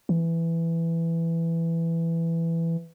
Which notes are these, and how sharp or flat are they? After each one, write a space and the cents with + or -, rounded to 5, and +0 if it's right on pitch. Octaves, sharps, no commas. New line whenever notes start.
E3 +10